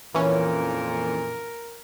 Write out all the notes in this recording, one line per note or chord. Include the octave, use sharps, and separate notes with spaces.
F2 A#2 E3 C#4 A#4